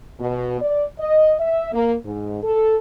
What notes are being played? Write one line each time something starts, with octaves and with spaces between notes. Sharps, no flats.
B2
D5
D#5
E5
A#3
G#2
A4